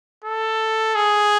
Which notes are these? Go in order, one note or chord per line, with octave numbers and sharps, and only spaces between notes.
A4
G#4